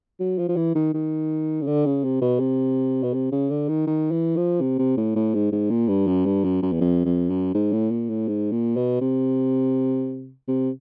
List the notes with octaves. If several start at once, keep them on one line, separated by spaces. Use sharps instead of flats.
F#3
F3
F3
E3
D#3
D#3
C#3
D3
C#3
C3
B2
C3
B2
C3
C#3
D3
D#3
D#3
E3
F3
C3
C3
A2
A2
G#2
G#2
A#2
G2
F#2
G2
F#2
F#2
E2
F2
F2
F#2
G#2
A2
A#2
A2
G#2
A#2
B2
C3
C3